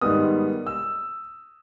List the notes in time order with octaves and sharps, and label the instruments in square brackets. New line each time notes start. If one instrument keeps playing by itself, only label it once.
[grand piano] G#2 D#3 G3 B3 D#6
E6